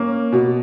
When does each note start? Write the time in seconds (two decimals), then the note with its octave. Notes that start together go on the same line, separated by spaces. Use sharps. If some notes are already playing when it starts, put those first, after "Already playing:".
Already playing: A#3 C#4
0.33 B2